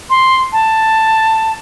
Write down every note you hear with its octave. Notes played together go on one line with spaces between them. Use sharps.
C6
A5